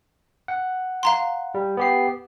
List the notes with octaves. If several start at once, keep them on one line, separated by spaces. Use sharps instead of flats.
F#5
F5 A#5 C6
G3
B3 G4 C7